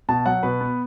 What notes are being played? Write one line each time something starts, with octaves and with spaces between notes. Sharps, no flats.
B2 A5
F#3 F#5
B2 B4
B3